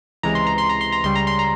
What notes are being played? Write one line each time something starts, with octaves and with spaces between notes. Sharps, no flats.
C#2 C3 E3 G#3 A#5
C6
A#5
C6
A#5
C6
A#5
C#2 C#3 G3 C6
A#5
C6
A#5